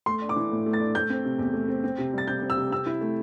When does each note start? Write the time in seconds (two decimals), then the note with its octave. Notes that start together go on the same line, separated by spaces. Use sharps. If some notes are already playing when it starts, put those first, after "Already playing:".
0.06 A3 C6
0.22 D4
0.29 D6
0.36 E3
0.51 A2
0.66 A3
0.73 A6
0.80 D4
0.95 A3 G6
1.10 C4
1.25 C3
1.39 E2
1.54 A3
1.68 C4
1.84 C4
1.98 C3
2.13 G3 A6
2.27 C3 G6
2.42 C4
2.50 E6
2.58 C3
2.72 C4 E6
2.86 E4
3.01 A3